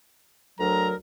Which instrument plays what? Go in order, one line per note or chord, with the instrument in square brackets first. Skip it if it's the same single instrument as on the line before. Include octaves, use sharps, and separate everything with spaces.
[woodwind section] D2 F#3 [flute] A#4 [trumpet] A#5